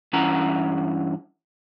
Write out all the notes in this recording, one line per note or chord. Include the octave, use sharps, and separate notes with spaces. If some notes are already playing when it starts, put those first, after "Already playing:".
G2 E3 C#4 E4 F#5 A#5